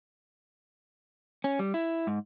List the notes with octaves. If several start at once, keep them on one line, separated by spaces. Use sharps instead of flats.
C#4
G3
E4
G#2